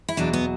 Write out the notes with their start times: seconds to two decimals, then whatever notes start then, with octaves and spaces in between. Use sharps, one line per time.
0.09 E4
0.17 E2 B2 F#3 D4
0.33 B3